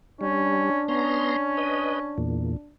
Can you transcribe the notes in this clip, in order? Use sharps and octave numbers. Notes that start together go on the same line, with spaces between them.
G3 C#4 D4
B3 C#4 A#5 C6
B4 D#5
E2 A#2